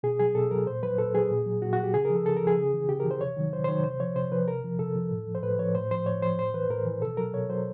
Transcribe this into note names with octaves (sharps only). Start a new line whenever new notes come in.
B2 G#4
F#3 G#4
B2 A4
F#3 A#4
A#2 C5
F#3 B4
A#2 A4
F#3 G#4
A#2
F#3
A#2 F#4
F#4
F#3
G4
C#3 G#4
F3 A#4
A4
C#3 A4
F3 A#4
G#4
C#3
E3
C#3 G4
A#4
E3
C5
C3 C#5
D#3 F#3
C3 C5
C5
D#3 F#3 C#5
C3 C5
F3 C#5
C3 C5
F3 B4
C3 A#4
F3
C3 A4
F3
A2
F3
C5
A2 B4
F3 C#5
A2 C5
F3 C5
A2 C#5
F3 C5
A2 C5
E3 B4
A2 A#4
E3
B2 A4
F#3 A#4
B2 C#5
F#3 C5